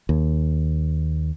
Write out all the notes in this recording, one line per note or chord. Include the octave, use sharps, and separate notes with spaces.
D#2